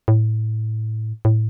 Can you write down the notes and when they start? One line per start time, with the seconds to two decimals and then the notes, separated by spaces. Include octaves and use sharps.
0.08 A2
1.25 A2